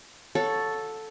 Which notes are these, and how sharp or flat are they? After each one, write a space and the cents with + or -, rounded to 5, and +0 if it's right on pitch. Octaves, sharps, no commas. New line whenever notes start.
A4 +0 C#5 +0 F#5 -40